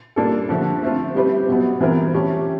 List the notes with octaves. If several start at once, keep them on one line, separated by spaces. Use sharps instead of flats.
G3 A#3 D4 F4 A4
D3 F3 A3
A3 C4 F4
G3 C4 E4 G4 B4
B2 F#3 B3
E3 G3 C4 F4 A#4
A3 C#4 E4 G4